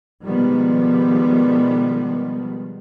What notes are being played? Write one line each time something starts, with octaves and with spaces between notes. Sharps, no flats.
B2 D#3 F3 G3 G#3 B3